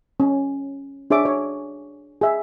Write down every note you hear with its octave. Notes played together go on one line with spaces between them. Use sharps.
C#4
D4 G#4 C#5 E5 D6
C#5
G#4 E5